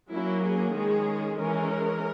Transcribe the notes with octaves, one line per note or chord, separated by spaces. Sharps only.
F#3 A#3 C#4 E4
G#4
D#3 G#3 C#4 G#4
E3 G#3 C#4 A#4